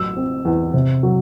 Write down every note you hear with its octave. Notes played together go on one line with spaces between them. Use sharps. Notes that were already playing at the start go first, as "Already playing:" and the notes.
Already playing: A1 F#3 E6
C4
E2
C3
F#3